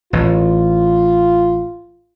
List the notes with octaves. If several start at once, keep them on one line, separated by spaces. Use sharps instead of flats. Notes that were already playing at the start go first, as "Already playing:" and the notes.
A1 A2 F4